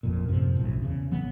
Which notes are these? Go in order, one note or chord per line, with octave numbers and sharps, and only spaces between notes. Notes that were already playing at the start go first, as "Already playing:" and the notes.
A1 F2 A#2
F#2 A2 C3 F3
F#1 B1 A2
E2 C#3
G#1 E3 F#3 B3